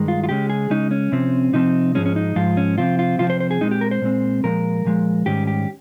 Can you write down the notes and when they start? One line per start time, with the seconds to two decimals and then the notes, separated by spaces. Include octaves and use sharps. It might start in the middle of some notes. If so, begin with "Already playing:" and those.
Already playing: G2 D#3 G#3
0.08 F4
0.24 F4
0.29 C#3 G#3 C#4 G4
0.50 G#4
0.70 C#3 G#3 C#4 D#4
0.91 C#4
1.12 C3 F3 C4
1.53 C3 F3 C4 D#4
1.95 G#2 F3 G#3 C#4
2.06 C#4
2.16 D#4
2.36 G#2 F3 G#3 F4
2.57 C#4
2.78 C3 F3 C4 F4
2.99 F4
3.19 C3 F3 C4 F4
3.30 C5
3.40 C5
3.51 G#4
3.61 A#2 G#3 C4 D#4
3.71 G4
3.81 A#4
3.91 C5
4.02 A#2 G#3 C4
4.44 A#2 F3 G#3 A#4
4.85 A#2 F3 G#3
5.26 G#2 D#3 G3 C#4 G4
5.47 G4